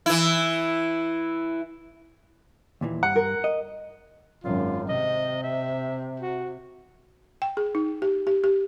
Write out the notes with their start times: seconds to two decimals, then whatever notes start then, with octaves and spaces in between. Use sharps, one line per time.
0.06 E3 E4
2.81 D#2 A#2 E3
3.03 G2 F#5
3.16 A#4
3.44 D#5
4.44 G#1 F#2 F4
4.89 C3 D#5
5.43 E5
6.20 F#4
7.42 G5
7.57 G#4
7.75 D#4
8.02 G4
8.27 G4
8.44 G4